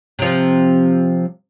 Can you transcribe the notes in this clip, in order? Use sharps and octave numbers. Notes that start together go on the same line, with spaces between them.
C3 F3